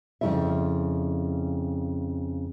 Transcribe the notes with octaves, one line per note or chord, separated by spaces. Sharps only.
F2 C#3 E3 G#3 E4 E5